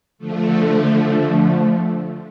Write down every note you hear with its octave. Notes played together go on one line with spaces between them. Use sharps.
D3 F3 A3